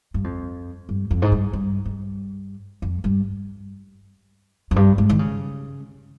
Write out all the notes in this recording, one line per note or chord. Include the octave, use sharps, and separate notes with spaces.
G2
F2
G2
F2
G#2
G2
G2
G2
F2
G2
F2
G2
G#2
D#3
C#3